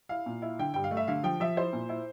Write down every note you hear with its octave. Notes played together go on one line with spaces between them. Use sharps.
E4 F5
A#2
E4
D3 G5
G2 G5
F5
A3
E5
D3 F5
F3 G5
F3 E5
E4 C5
A#2
E4